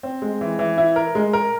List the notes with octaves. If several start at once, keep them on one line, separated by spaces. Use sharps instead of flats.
C4
G#3
E3
E3
E4
A#4
G#3
A#4